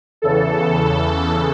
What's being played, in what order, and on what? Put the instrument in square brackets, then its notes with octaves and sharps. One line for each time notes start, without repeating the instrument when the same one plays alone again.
[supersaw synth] E2 C#3 E3 A4